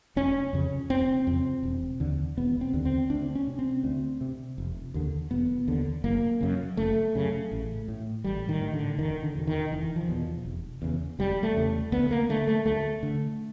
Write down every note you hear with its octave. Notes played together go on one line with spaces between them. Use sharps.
F1 C#4
F2 C#3
F1 C4
F2 C#3
E1
D#2 D3
E1 B3
C4
D#2 D3
C4
D2 D4
C#4
C3
C4
D2
C3
F1
D#2 D3
F1 B3
D#2 D3
F#1 A#3
F#2 C#3
F#1 A3
F#2 C#3
A1
A2
A1 G3
D#3
A2
D3
F1 D#3
D3
E2 B2
D#3
F1 E3
F3
E2 B2
F1
E2 C#3
F1 G3
A3
E2 C#3
D2 B3
A#3
D3 A3
A3
D2 A3
D3